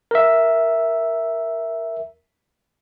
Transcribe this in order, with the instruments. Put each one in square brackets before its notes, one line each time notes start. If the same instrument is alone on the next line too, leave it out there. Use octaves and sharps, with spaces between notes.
[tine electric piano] A#4 E5